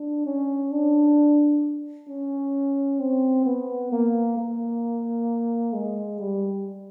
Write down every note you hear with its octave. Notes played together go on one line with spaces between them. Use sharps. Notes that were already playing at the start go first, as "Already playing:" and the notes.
Already playing: D4
C#4
D4
C#4
C4
B3
A#3
A#3
G#3
G3